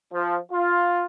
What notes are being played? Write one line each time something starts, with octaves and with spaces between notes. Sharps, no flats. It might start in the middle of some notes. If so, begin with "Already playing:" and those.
F3
F4